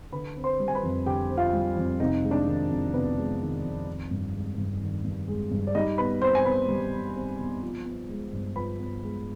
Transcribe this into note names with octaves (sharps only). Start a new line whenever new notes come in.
D3 B4 B5
C4
C5 C6
G3
G#5
B4 B5
F2
D3 G4 G5
C4
F4 F5
G3
F2
C3 D#4 D#5
G#3
D4 D5
D#3
F2
C3 B3 B4
G#3
D#3
F2
D#3
G2
G#3
G2
D#3
G2
G#3
G2
D5
G3 D#4 D#5
B2 B4 B5
C4 C5 C6
G#5
B2 B4 B5
G3
B2
C4
B2
F3
B3
G#3
G2
F3 B4 B5
B3
G#3